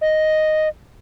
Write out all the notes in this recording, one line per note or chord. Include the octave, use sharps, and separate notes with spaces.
D#5